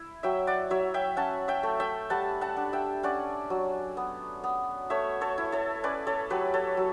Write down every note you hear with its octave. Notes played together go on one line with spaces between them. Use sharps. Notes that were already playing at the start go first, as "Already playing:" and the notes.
Already playing: E4
F#3 E5 G5
D5 F#5
F#3 C#5 E5
E5 G5
C#4 F#5 A5
E5 G5
A3
E5 G5
G3 F#5 A5
F#5 A5
D4
E5 G5
C#4 D5 F#5
F#3
B3
B3
A3 C#5 E5
A4 C#5
E4
A4 C#5
C#4 B4 D5
A4 C#5
F#3 G4 B4
A4 C#5
F#3